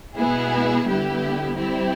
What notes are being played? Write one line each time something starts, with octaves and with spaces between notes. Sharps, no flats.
B2 G#3 B3 E4 G#4
D3 G3 B3 E4 G4
G3 C4 E4 G4